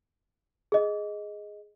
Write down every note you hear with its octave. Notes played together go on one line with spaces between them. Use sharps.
G#4 D#5